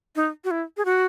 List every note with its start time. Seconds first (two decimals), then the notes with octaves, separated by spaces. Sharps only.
0.16 D#4
0.44 F#4
0.51 E4
0.77 G#4
0.85 F#4